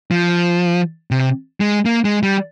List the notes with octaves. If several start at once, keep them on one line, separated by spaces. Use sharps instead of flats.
F3
C3
G#3
A#3
G#3
G3